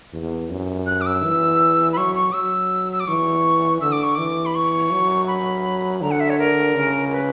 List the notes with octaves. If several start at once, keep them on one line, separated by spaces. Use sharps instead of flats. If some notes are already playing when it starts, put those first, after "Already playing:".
E2
F#2
F#6
D6
E6
E3
B5
F#3 C#6
C#6
F#3 E6
E6
D6
E3 C#6
D3 E6
D6
C#6
E3 D6
B5
C#6
F#3
B5
D3 A#5
F#5
E5
C#5
A#4
C#3
B4